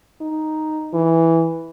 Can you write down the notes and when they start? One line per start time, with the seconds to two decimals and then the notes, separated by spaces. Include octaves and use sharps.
0.21 D#4
0.93 E3